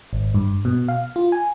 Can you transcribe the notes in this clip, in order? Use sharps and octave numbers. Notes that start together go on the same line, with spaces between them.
G#1
G2
B2
F5
F4
G#5